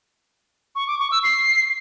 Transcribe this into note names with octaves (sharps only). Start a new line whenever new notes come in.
C#6
D6
C#6
E6
C7